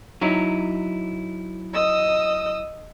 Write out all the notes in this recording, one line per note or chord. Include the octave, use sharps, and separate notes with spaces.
F#3 D#4 E4
D#5 D#6 E6